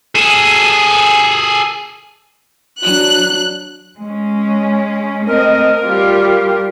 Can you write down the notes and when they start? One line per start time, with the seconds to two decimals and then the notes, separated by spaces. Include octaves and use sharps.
0.15 G#4 A4
2.84 F#3 D4 F#6
3.99 G#3 C#4
5.27 A3 C4 A#4 D#5
5.83 G3 F4 G4